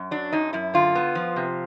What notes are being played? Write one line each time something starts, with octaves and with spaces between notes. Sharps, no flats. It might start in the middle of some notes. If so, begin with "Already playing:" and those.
Already playing: F#2
F#3 D4
F#2 D#4
F#2 E4
D3 F4
B3
F3
C3